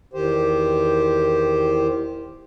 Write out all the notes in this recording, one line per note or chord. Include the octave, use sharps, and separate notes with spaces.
E2 D#3 G4 C5